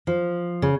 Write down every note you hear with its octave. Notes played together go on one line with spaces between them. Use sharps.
F3
C#3